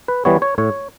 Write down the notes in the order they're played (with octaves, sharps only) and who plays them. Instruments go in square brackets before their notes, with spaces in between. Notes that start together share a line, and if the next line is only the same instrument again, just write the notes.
[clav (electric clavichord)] B4
E3 G3 B3 C#5
C#5
A2 C#5